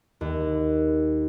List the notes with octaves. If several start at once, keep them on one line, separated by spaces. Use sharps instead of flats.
D#2